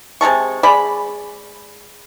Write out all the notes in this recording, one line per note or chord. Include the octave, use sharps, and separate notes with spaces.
C3 G#3 A5 C#6
G#3 D5 B5